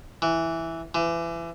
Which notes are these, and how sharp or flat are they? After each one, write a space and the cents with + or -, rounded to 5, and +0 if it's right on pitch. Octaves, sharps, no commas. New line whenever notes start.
E3 +0
E3 +30